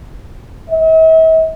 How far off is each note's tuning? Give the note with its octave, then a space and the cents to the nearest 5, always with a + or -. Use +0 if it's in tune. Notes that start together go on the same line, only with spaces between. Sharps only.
E5 -45